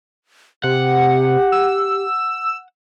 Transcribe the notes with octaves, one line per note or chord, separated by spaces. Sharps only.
C3 G4 F#5
E6